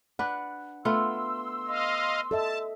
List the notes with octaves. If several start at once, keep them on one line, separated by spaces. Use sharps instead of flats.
D4 B4 F#5
A3 B3 F4 C6 E6
D#5 F5
A4 D#5 E5 A5